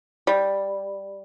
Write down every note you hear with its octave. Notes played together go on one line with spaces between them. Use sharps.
G3